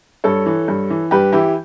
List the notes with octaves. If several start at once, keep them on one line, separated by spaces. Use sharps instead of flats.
G2 A4 C#5
E3
G2
E3
G2 G4 B4
E3 E4 G4